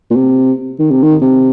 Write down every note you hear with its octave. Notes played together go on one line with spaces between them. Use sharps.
A#2
C3
D#3
C3
D#3
C3